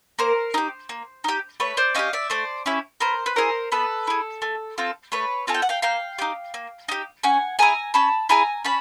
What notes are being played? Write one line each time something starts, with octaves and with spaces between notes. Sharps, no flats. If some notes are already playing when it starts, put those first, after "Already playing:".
A#3 A#4 C5
D#4 G4
A#3
D#4 G4
A3 B4 C#5
C5 D5
C#4 E4 G4 D#5 F5
D5 E5
A3 C5 D5
C#4 E4 G4
B3 A#4 C5
B4
E4 G#4 A#4 C5
B3 A4 B4
E4 G#4
A3
C4 F4 A4
A3 B4 C#5
C4 F4 A4 G#5
G5
F#5
F5 G5
A#3 F5 G5
D#4 G4
A#3
D#4 G4
C#4 F#5 G#5
E4 G#4 G#5 A#5
C#4 A5 B5
E4 G#4 G#5 A#5
C#4 A5 B5